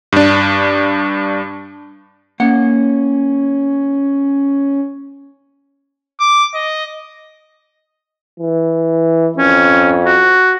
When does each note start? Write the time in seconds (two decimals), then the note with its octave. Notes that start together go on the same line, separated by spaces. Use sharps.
0.12 G2 D4
2.40 A#3 C#4 F#5
6.20 D6
6.54 D#5
8.40 E3
9.38 F2 C#4
10.06 F#4